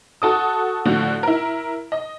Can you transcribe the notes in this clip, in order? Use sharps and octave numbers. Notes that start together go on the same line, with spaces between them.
F#4 A4 D#6
A2 D3 F3 F#4
E4 A#4
D#5